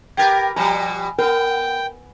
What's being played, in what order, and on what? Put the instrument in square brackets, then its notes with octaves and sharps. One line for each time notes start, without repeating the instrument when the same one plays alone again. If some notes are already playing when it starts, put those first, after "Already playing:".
[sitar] G4 A#4 B4 [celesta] G5 G#6 A6
[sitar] B2 F3 G3 [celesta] G#5 [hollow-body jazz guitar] A#5
[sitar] B3 [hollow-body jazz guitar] A#4 [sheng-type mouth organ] G5